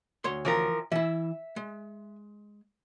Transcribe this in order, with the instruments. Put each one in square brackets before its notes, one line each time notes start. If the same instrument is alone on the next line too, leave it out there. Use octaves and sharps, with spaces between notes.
[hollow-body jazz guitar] D2 C#5 C6
[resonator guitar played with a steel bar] E3 F3 A#4
[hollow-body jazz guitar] E3 E4 [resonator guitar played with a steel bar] E5
[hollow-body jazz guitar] G#3